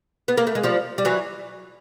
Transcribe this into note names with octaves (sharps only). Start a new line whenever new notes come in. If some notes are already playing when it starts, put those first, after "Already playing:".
B3
A#3
A3
G#3
F3 G3
G3
E3 F#3